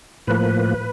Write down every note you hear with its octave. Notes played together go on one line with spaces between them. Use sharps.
A2 F3 A#3 B4